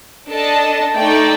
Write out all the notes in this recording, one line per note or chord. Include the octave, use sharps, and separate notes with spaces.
D4 A4 D#5 A5
A3 D#4 A4 D5 G5